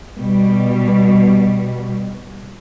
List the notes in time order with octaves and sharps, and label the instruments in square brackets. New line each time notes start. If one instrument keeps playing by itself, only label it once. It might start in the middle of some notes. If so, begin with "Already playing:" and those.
[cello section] B2 G3